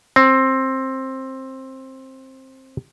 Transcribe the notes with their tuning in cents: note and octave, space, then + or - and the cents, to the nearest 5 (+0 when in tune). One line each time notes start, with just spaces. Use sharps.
C4 +15